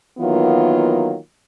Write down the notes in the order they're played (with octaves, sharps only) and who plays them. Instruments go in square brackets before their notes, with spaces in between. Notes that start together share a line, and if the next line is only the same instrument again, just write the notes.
[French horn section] D#3 E3 F#3 A#3 B3 F4